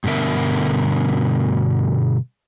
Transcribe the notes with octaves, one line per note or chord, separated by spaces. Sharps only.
G2 B2 D3 A#4 E5